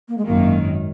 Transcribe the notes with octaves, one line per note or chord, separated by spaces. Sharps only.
A#3
G#3
G#1 F#2 D#3 A#3